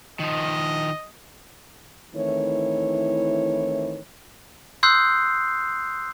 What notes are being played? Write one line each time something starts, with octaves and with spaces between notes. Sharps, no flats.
D#3 F3 D#5
D#3 E3 A3 C4 E4 C#5
C6 D#6 E6 F#6 G6 C7